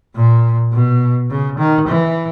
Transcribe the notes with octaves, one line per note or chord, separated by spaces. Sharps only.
A#2
B2
C#3
D#3
E3